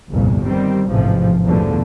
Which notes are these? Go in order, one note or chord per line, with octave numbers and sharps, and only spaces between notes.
G1 C2 F2 A#2
D#3 G3 C4
A1 G#2 C3 F3
E2 G2 B2 D3 F3 A3